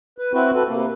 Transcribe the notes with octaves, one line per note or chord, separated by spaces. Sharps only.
B4
C4 E4 F#4 B4
F#4 A4 B4
C3 A#3